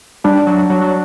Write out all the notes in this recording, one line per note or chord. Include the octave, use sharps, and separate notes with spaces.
G3 D4
F#3
F#3
F#3